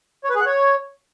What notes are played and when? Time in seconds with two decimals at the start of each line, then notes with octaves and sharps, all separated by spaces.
0.24 C#5
0.30 B4
0.35 G#4
0.40 F#5
0.46 C#5